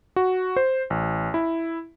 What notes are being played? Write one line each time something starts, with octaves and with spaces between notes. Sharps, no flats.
F#4
C5
A1
E4